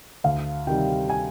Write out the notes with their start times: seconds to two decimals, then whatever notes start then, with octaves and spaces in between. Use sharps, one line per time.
0.24 D2 F5
0.67 C3 D#3 G3 G5
1.10 G#5